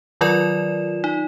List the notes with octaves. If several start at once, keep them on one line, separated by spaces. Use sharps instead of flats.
D#3 F#3 F4 A#4 D5 E7
D#4